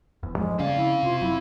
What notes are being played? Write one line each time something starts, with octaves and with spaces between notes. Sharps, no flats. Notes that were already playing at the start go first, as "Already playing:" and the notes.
E1 E2
A1 G2 F3 G#3
C#3 C4 C#4 D5 F5
E4
C3 F4
F#1 F#3 E4